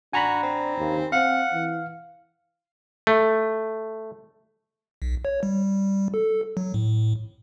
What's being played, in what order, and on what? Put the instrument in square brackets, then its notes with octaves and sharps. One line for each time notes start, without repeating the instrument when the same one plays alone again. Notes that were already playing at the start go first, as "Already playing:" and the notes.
[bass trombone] D4 [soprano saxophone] F#4 [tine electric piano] G#5 A#5 B5
[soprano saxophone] C4
[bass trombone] D#2
[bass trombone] C4 [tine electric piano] F5 [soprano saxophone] F#5
[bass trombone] E3
[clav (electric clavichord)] A3
[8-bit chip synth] B1
C#5
G3
A4
F#3
A2